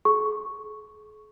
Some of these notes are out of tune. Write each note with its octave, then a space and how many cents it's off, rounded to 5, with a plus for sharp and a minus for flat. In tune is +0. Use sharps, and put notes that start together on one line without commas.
G#4 +40 C#6 +0